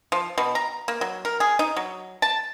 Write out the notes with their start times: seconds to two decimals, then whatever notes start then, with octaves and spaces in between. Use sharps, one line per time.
0.12 F3
0.38 B2
0.55 A#5
0.88 A#3
1.01 F#3
1.25 A#4
1.40 G#4
1.59 D#4
1.77 F#3
2.22 A5